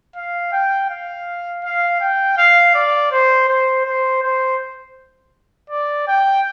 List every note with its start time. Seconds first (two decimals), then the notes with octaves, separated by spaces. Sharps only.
0.16 F5
0.52 G5
0.90 F5
1.64 F5
2.01 G5
2.38 F5
2.74 D5
3.12 C5
3.48 C5
3.85 C5
4.23 C5
5.70 D5
6.07 G5